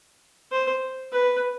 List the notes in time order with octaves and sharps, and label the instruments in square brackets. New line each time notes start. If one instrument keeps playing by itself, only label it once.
[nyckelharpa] C5
B4